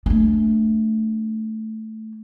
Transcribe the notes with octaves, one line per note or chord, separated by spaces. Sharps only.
A3 D4